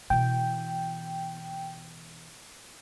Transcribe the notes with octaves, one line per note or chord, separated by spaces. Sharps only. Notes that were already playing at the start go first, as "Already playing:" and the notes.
B2 E3 G5